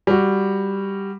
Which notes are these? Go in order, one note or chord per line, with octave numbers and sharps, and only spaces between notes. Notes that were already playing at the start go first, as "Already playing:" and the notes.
G3 F#4